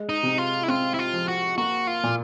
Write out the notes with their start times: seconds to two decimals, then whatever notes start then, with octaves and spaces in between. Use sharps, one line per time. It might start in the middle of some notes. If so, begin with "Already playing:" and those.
Already playing: G#3
0.09 D#4
0.23 C3
0.38 F4
0.63 E4
0.68 C4 F4
0.94 E4
0.99 F4
1.13 F3
1.28 F#4
1.57 A#3 F#4
1.87 F4
2.03 A#2